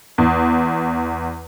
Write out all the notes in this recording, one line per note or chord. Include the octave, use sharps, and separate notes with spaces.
E2